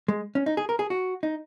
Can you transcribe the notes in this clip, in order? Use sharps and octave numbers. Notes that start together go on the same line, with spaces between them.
G#3
C#4
D#4
G#4
A#4
G#4
F#4
D#4